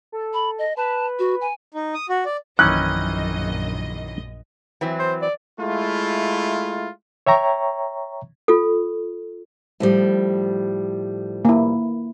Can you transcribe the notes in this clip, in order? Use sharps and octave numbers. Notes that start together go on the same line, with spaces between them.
A4
B5
D#5
B4 A5
F#4
G#5
D#4
D#6
F#4
D5
A#1 F#2 D#3 E3 C#4 D#5 F#6
E3 F#3 C4
C5
D5
G#3 A3 E4 F4
C#5 E5 G5 A#5 C#6
F4 A4
A2 F3 G3
A#3 E4